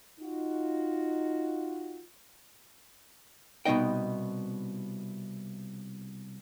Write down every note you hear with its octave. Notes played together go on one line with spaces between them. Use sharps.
D#4 F4 F#4
C2 B2 F#3 D#4 D#5 G5